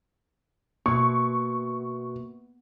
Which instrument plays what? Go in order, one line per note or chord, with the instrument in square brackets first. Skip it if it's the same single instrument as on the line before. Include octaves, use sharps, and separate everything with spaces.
[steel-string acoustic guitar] B2 [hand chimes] A#3 [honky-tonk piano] C#6